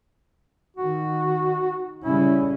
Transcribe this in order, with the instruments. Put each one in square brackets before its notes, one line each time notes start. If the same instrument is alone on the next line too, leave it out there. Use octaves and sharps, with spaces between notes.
[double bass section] D#3 [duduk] F#4
[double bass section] C#3 G3 C#4 [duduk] E4